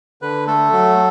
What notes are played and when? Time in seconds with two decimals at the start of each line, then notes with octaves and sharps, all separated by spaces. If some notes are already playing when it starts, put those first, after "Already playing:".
0.22 D3 B4
0.47 A3 A4
0.72 F#3